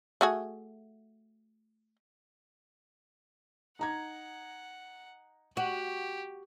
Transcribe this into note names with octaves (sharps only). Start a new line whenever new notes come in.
A3 F#4 G#4
D#4 F#5 A#5 G#6
F#4 G4